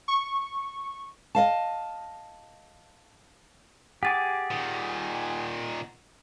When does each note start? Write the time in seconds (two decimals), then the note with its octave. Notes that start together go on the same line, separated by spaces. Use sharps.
0.08 C#6
1.35 D#5 F5 A5
4.03 G4 G#4 F#5 D6 A6
4.51 A#2 D#3